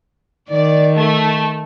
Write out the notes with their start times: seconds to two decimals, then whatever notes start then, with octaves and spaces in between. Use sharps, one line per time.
0.51 D#3 D5
0.95 A3